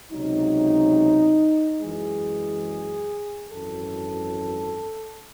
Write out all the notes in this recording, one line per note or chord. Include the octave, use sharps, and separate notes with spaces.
C#2 C3 F#3 D#4
F#2 E3 G#3 G#4
G#1 F#2 E3 A4